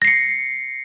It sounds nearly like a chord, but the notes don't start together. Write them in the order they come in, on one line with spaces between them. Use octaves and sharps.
A#6 C7 C#7